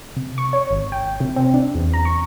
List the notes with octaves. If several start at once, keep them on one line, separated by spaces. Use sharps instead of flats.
C3
C#6
C#5
G#1
G5
C3
C4
D4
E2
A#5
C#6